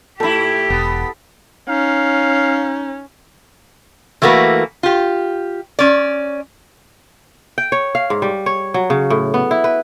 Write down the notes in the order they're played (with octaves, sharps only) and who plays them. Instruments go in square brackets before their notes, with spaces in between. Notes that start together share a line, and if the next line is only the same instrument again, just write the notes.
[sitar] A2 E4 [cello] G4 [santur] A4 B5
[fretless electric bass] E1 [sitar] B3
[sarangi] C#4 [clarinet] D#4 [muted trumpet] F5
[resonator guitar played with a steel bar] E3 A3 A#3 F#4 B4
F4 G4
C#4 D5
[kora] G5
C#5
F5
G#2
G3
C#5
F#3
C#3
A2
B3
E4
B4